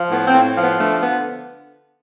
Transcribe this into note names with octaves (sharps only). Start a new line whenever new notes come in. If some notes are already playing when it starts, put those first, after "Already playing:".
Already playing: F3
A2 B3
C4
A2
F3
B3
D3 A3
B3